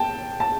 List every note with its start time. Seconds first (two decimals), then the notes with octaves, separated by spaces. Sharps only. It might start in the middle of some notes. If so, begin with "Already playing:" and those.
Already playing: G5 A5
0.40 A5